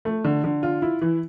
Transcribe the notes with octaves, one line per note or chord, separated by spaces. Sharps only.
A3
D3
D3
F4
E4
E3